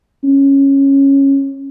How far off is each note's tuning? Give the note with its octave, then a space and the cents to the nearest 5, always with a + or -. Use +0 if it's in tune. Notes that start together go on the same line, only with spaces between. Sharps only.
C#4 -10